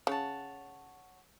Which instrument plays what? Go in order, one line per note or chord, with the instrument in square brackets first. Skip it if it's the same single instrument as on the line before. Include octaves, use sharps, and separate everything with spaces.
[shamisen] C#3 [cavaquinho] C#5 F#5 A5